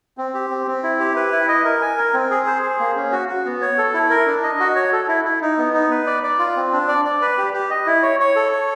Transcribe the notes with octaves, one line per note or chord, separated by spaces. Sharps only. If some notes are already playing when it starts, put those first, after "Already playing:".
C4
G4
C4
C4
E4
G4
B4
E4
D#5
A#4
G#5
A#4
C4
G#4
C5
G#4
A#3
C#4
F#4
F#4
B3
C#5
A4
E4
A#4
D4
D#5
F#4
C#5
A4
E4
E4
D#4
B3
D#4
B4
D5
D5
F4
C4
D4
D5
D5
B4
G4
G4
D#5
E4
C#5
C#5
A4
C#5